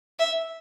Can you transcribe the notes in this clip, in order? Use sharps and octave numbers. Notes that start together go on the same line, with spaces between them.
E5